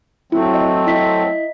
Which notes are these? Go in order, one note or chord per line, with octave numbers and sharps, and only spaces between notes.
F#3 A3 C4 E4
D#5
E4 D#5 B6